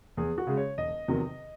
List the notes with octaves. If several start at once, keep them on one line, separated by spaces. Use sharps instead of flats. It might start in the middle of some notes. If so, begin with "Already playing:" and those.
E2 G#4
F#4
C#3 G#3
C#5
E1 D#5
E2 C3 D#3 F#3